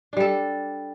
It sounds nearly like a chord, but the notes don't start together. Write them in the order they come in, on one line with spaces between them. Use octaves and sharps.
D4 G3 A4